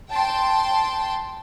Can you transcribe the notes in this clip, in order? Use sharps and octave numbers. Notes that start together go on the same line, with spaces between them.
G5 A5 C6